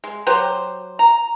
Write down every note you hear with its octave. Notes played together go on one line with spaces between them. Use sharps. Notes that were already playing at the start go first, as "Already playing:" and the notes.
G#3
F#3 G4 C5
A#5